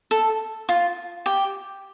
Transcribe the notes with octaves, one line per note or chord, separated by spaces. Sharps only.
A4
F4
G4